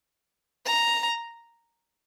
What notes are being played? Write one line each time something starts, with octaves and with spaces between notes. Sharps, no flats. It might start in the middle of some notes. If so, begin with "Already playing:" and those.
A#5